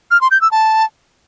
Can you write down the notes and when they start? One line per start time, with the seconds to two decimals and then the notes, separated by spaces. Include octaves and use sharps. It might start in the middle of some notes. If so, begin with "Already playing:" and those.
0.11 F6
0.21 C6
0.31 G6
0.41 E6
0.51 A5